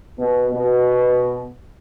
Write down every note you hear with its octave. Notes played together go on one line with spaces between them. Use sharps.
B2
B2